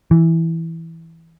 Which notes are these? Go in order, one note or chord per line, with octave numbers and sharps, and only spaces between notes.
E3